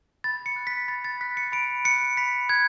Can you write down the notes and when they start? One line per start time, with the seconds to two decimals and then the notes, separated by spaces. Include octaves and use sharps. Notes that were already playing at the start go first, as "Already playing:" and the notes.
0.24 B5 A6
0.46 C#7
0.56 F#6
0.67 B6
0.88 B5 A6
1.04 A6
1.21 F#6 B6
1.37 C#7
1.52 B5 D7
1.85 F#6 C#7
2.17 B5 B6
2.49 F#6 G#6